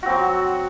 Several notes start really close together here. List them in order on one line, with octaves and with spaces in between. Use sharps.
F#4 C4 F#3